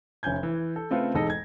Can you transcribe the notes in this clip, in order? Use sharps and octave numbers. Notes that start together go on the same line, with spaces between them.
F1 C#4 G#5 G6 G#6
E3
A4
C#3 A3 C4 F4 A4 B4
E1 G#2 G#3 A4 D#5 A#6
G#6